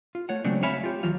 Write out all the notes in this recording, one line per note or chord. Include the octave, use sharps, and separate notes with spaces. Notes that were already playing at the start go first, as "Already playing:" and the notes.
F4
A3 C#5 F#5
C#3 F#3 G#3 A3 C4 D4
C#5 E5 F5 G#5 B5
F4 G4
D#2 E3 F#3 F4 F5